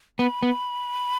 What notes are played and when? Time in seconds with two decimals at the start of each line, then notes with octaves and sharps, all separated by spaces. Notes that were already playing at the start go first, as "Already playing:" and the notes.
0.19 B3 B5
0.43 B3